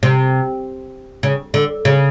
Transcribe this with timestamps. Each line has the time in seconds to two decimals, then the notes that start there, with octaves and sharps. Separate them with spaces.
0.03 C3
1.23 C#3
1.54 D3
1.85 C#3